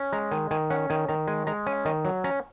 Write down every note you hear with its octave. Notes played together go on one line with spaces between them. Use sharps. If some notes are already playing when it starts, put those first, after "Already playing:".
Already playing: C#4
G#3 A#5
D#3 G#5
D#3 G#5
C#4 F#5
D#3 G#5
D#3 A#5
G#3 G#5
G#3 A#5
C#4 G#5
D#3 D#5
F#3
C#4 A#5